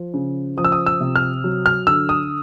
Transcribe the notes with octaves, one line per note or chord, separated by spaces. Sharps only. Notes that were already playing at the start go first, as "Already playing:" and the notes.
Already playing: F3
C#3
F3 D#6
E6
D#6
E6
C3
F6
F#3
F6
D3 E6
D#6